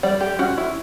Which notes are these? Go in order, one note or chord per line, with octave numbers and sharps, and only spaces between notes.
G3 D5
G4
C#4 F#4
E4